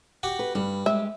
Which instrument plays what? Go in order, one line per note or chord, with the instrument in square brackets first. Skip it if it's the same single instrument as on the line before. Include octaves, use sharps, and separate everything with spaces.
[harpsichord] F#4 G4 F#5
[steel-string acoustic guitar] B4
[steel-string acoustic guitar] G2 [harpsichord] G3
[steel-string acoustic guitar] G#3 G4 [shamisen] E5